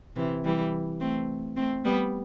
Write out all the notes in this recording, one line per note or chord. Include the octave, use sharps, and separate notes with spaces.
C3 E3
E3 G3
A3 C4
A3 C4
G3 B3